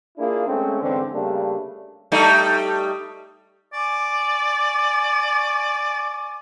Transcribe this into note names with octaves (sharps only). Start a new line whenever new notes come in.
A#3 D4 E4 F4 G#4
G#3 A3 C4 C#4
G#2 D3 E3 C4
C#3 G3 A3 A#3 D4
G3 A3 D#4
D5 G#5 C#6 D6